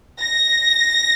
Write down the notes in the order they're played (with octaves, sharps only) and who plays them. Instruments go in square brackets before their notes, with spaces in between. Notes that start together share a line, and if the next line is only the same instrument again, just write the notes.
[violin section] A#6